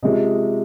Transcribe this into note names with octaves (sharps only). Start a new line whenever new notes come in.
C3 F3 G#3 C#4 D#5